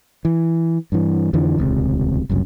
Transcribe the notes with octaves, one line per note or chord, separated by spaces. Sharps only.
E3
G2 E3
F2 D3 E3 F3
D#1 C#2 C3
F#1 C2 F#2